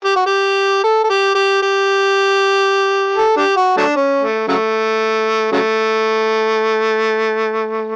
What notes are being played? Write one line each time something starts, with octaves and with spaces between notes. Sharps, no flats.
G4
F#4
G4
A4
A4
G4
G4
G4
A4
D4 G4
F#4
F#3 A3 D4
C#4
A3
C#3 F#3 A3
C#3 F#3 A3